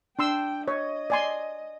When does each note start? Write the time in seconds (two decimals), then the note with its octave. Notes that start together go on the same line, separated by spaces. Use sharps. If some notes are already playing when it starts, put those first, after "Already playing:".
0.19 D4 G5 C6 E6
0.68 C#5 D#5
1.10 D5 G#5 C6